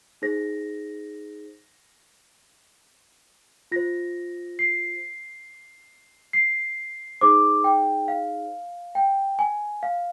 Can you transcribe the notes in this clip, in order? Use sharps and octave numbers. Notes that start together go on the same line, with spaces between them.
D#4 G#4 C5 A#6
F4 C5 A#6
C7
C7
D#4 G#4 C5 D6
G5
F5
G5
G#5
F5